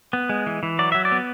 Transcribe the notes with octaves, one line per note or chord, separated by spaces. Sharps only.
B3
G#3
E3
E3
F#3 D5
F#3 E5
D5
B3